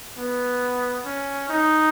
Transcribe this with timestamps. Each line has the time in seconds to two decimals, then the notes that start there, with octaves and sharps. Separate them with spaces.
0.17 B3
1.05 C#4
1.49 D#4